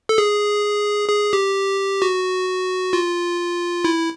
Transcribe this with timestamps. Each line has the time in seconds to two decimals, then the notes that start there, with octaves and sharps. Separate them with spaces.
0.09 A4
0.18 G#4
1.09 G#4
1.33 G4
2.02 F#4
2.93 F4
3.84 E4